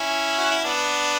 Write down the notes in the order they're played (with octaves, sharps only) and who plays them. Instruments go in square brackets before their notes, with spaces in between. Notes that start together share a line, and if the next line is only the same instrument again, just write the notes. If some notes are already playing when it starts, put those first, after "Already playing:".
Already playing: [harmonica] C#4 E4
F#4
E4
B3 D4